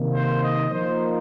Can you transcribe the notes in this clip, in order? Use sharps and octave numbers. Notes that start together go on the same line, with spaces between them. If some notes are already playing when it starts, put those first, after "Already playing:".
Already playing: C3 D#3 A#3 D#4
C5
D#5
F3 A#3 D#4 C5